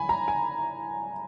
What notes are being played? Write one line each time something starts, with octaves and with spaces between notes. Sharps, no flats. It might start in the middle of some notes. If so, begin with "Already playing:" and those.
Already playing: G#5 B5
A#5
G#5